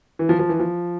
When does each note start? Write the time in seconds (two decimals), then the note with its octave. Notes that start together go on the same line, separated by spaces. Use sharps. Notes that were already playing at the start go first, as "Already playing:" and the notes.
0.19 E3
0.29 F3
0.39 F3
0.49 E3
0.59 F3